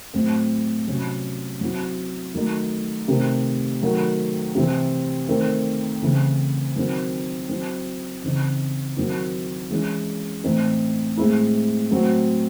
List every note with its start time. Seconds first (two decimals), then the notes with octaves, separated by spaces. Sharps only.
0.14 A2 F#3 C4
0.87 C3 F#3 C#4
1.61 F#3 C4 E4
2.34 D#3 F#3 A3 D#4
3.08 C3 D#3 A3 C4
3.81 D#3 F#3 A3
4.55 C3 E3 C4
5.29 D#3 A3 C4
6.02 C#3 E3 A3 C4 E4
6.76 D#3 F#3 C4 D#4
7.49 F#3 C4 E4
8.23 C#3 E3 C4 D#4
8.97 D#3 F#3 C4 E4
9.70 E3 G#3 C#4 E4
10.44 A2 E3 C4 D#4
11.17 A2 G#3 C4 E4
11.91 A2 F#3 C4